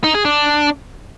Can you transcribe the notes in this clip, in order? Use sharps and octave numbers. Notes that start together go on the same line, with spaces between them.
D#4
G#4
D4